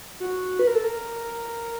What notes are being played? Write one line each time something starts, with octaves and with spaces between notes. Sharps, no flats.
F#4
B4
A#4
A4
A#4